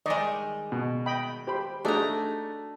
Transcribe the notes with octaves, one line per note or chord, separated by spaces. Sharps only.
D#3 G3 G#3 D5 D#5
B2
D#5 G5 B5
G4 C5 B5
A3 D4 D#4 F#4 G#4 A#5